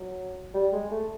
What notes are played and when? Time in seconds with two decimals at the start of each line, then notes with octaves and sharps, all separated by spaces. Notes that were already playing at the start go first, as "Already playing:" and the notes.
Already playing: F#3
0.54 G3
0.72 G#3
0.91 A3